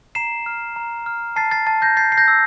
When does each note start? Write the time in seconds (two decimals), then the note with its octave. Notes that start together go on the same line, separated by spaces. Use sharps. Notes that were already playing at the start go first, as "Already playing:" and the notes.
0.15 A#5 C7 E7
0.46 F6
0.76 A#5
1.06 F6
1.36 A5 A6 C7
1.51 A6 C7
1.67 A5 A6
1.82 G6 A#6
1.97 G6 A6 C7
2.12 C7
2.17 G6 A#6
2.28 E6